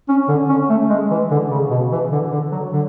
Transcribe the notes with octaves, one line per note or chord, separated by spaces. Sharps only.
C#4
D3
C#4
A3
G#3
E3
D3
C#3
B2
E3
D3
D3
F#3
D3